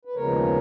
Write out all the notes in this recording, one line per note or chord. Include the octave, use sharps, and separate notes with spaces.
B4
D#2 C#3 F3 G#3 B3 A#4 C#5